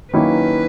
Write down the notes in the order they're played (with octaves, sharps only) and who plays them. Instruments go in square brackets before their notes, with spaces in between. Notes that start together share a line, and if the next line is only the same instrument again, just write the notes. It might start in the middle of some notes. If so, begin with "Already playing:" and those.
[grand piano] D#3 F#3 A#3 C#4 E4 [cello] B4